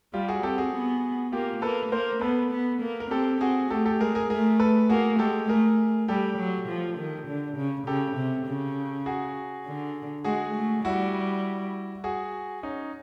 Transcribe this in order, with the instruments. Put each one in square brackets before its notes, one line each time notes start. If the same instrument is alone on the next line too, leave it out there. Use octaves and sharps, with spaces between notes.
[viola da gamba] G3 [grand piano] F4 G4
[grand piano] F#4 G#4
[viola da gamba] C4 [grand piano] G4 A4
[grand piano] F#4 G#4
[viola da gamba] B3
[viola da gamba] A#3 [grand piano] F4 G4
[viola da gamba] A#3 [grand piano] A4 B4
[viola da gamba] A#3 [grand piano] A#4 C5
[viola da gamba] B3 [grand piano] A4 B4
[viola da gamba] B3
A#3
[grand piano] A#4
[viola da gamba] C4 [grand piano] G4 A4
[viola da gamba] C4 [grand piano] F#4 G#4
[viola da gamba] A3 [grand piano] G4 A4
[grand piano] G4 A4
[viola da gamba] G#3 [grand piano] G#4 A#4
[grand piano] G#4 A#4
[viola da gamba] A3 [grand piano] G#4 A#4
[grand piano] A4 B4
[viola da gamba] A#3 [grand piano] F#4 G#4
[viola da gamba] G#3 [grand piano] G4 A4
[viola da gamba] A3 [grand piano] G#4 A#4
[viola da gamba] G3 [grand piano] G4 A4
[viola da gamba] F#3
F3
D#3
D3
C#3
[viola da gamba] C#3 [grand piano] G4 A4
[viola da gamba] C3
C#3
[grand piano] F#4 G#4
[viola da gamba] D3
[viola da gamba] G#3 [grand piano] F#4 G#4
[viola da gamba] A3
[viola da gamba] G3 [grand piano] E4 F#4
[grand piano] F#4 G#4
C#4 D#4